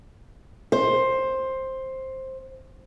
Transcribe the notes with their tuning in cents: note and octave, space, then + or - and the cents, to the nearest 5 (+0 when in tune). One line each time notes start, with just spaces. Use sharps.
C5 +10